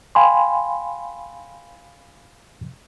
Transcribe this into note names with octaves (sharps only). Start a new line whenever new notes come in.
F5 G5 G#5 B5 C6